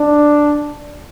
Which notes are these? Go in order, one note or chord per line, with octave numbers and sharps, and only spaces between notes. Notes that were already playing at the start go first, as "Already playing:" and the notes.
Already playing: D4